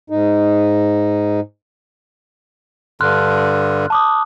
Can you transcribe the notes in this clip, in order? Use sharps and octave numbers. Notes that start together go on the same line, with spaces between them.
G#2 D#4
G2 D3 C6 F6 F#6
A5 D6 D#6